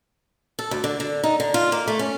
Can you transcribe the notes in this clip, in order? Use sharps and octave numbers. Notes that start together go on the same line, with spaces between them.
A4
D2
D3
D3
D#4
D3
F4
A#3
A3
C#4